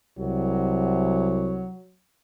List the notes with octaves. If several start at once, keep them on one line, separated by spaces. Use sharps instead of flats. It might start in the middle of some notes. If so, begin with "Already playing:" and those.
C2 F#3